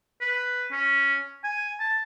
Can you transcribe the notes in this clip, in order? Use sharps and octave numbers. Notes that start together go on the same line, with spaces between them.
B4
C#4
G#5
A5